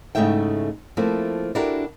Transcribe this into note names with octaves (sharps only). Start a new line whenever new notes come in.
G#2 C#3 A3 E4 E5 G5
F3 A3 A#3 C4 E4
D4 E4 F#4 G4 A4 A#4